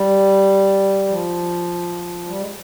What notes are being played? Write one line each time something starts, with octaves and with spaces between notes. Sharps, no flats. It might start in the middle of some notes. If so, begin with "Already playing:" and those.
Already playing: G3
F3
G3
G#3